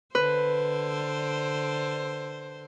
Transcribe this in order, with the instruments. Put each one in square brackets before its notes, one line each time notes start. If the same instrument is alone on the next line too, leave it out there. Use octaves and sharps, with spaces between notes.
[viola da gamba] D3 C5 [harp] B4